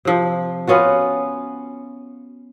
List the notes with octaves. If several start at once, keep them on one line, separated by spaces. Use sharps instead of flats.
C3 F3
B3 C#4 F4 F#4